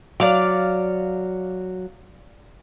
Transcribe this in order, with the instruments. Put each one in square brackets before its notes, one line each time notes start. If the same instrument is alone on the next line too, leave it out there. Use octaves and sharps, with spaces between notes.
[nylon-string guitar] F#3 [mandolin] D5 F5 D6